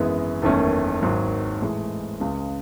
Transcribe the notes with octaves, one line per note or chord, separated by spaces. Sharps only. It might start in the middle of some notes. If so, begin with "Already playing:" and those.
Already playing: G#1 F#2 E3 G#3 B3
F#1 E2 D#3 A3 C#4
G#1 G#2 D#3 F#3
A2 E3 G#3
C#2 C#3 G#3